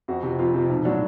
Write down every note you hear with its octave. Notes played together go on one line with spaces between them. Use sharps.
F2 F#4
C3 F3
F2 F4
C3 F3
B1
A2 F#3 D4